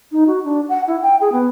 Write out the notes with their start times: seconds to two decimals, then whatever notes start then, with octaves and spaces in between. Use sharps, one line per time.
0.12 D#4
0.27 F#4
0.44 D4
0.69 F#5
0.88 E4
1.02 G5
1.21 G#4
1.32 B3